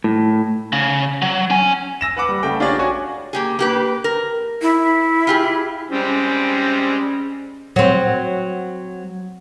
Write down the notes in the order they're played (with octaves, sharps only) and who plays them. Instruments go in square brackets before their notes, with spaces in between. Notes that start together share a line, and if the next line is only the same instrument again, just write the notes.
[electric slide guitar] A2
[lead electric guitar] C#3
F#3
C#4 G#5
[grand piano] E6 A#6 E7
B4 F#5 D6
G3
C#3 A3 G5
D4 F4 G4 G#4 C#5 D5
F#4 C#5 G#5
[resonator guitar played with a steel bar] A#3 G4 G#4
A#3 G4 B4
A#4
[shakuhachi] E4
[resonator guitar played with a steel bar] F4 G4 G#4
[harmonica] G3 G#3 C4 [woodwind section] C#4
[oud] F#3 C4